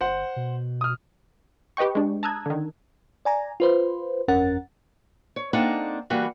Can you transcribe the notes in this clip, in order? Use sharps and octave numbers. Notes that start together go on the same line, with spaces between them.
G1 C5 F#5
B2
D#6 F6
G4 B4 D#5 G5 C#6
G#3 D4
A5 A#5 D#6 E6 F#6 G#6
D3 D#3
D5 G#5 A#5
F4 B4 C5
G1 F2 C#4 A#4 F#5 A6
C#5
A#3 C4 D4 D#4 A4 F#5
E3 G3 A#3 F#4